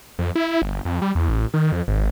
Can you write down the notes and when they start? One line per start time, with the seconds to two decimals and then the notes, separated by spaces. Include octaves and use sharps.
0.19 F2
0.35 E4
0.62 G1
0.85 F2
1.02 G3
1.15 E2
1.29 A1
1.54 D#3
1.72 F2
1.88 G#1